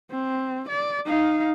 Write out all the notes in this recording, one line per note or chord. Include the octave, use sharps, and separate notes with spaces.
C4
D5
D#4 F5